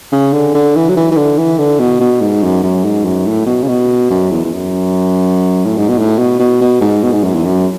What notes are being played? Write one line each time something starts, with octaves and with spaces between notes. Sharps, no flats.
C#3
D3
D3
E3
F#3
E3
E3
D3
E3
D3
B2
B2
G#2
F#2
F#2
G#2
F#2
A2
B2
C#3
B2
F#2
E2
E2
F#2
A2
G#2
B2
A2
B2
B2
B2
G#2
B2
G#2
F#2
E2
F#2